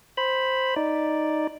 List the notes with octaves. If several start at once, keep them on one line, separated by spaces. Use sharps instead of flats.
C5 B5
D#4 D5